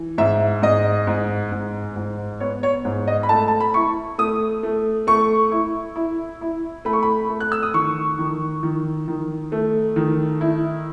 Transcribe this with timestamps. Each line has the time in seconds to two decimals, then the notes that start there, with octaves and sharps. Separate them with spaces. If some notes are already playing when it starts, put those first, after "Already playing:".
Already playing: E3
0.18 G#2 E5
0.62 G#2 D#5
1.07 G#2
1.52 G#2
1.96 G#2
2.40 B3 C#5
2.63 C#5
2.85 G#2
3.08 D#5
3.23 B5
3.29 A3 A5
3.48 A5
3.61 B5
3.74 E4 C#6
4.18 A3 D#6
4.63 A3
5.07 A3 C#6
5.52 E4
5.96 E4
6.41 E4
6.85 A3 B5
6.93 C#6
7.03 B5
7.29 A3
7.40 F#6
7.52 E6
7.63 D#6
7.74 D#3 C#6
8.18 D#3
8.63 D#3
9.08 D#3
9.52 A3
9.96 D#3
10.41 E4